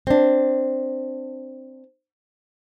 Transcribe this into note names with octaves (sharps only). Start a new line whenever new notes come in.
C4 D4